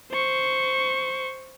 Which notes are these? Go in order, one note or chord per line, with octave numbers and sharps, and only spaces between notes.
C5 C#6